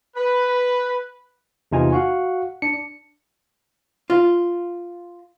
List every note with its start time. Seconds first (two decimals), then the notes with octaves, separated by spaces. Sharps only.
0.16 B4
1.72 E2 C3 D#4 F4 G#5 A#5
1.92 F#4 F5 F#5
2.62 D4 C#7
4.10 F4